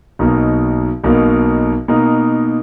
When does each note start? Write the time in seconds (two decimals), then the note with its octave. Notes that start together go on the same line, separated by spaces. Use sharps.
0.19 B1 B2 A#3 D#4 A#4
1.04 B1 B2 A#3 D#4 A#4
1.88 B2 A#3 D#4 A#4